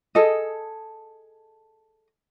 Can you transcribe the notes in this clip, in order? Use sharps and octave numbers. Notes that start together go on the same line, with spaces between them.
G#4 A4 D#5